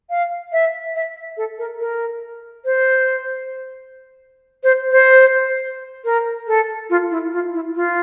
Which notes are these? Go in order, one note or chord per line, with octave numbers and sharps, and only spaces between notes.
F5
E5
E5
A4
A#4
A#4
C5
C5
C5
A#4
A4
F4
E4
F4
E4
F4